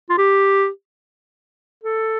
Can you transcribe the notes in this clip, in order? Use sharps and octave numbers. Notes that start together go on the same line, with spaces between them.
F4
G4
A4